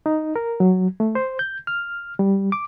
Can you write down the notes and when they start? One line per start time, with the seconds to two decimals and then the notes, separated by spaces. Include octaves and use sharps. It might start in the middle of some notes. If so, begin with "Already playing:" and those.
0.06 D#4
0.36 A#4
0.60 F#3
1.00 A3
1.15 C5
1.39 G6
1.67 F6
2.19 G3
2.52 D6